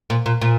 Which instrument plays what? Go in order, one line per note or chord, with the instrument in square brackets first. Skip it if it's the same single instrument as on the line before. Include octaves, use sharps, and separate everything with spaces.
[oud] A#2
A#2
A#2